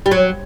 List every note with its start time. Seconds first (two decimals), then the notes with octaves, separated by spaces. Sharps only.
0.06 G3
0.11 F#3